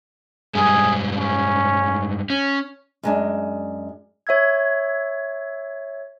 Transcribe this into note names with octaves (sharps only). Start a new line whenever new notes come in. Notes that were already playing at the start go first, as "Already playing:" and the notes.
G2 G3 G#3 G#4
C#4
C#4
F#2 G#3 D4
C#5 E5 E6 G#6